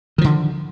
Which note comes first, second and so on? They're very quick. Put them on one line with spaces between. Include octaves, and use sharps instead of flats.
D#3 F3 D3